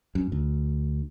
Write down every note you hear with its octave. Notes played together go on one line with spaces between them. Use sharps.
F#2
D2